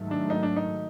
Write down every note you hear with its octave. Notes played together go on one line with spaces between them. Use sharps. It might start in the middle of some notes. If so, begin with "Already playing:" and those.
Already playing: G#2 D#3 F#3 A3
D4
D#4
D4
D#4